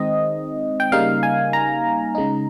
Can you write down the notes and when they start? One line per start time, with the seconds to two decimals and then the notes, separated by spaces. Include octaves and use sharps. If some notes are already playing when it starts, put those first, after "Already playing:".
Already playing: D#3 G#3 C4 D#4 D#5
0.80 G5
0.92 C#3 G3 A#3 D#4 F5
1.23 G#5
1.53 A#5
2.15 C#3 G#3 D#4